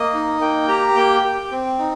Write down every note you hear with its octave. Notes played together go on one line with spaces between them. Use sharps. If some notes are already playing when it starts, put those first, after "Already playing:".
Already playing: A#3 D#5
D#4
A#3 G5
G4 A#5
A#3 G5
G4
C4
D#4